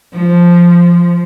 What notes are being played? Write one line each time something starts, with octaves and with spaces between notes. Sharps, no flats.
F3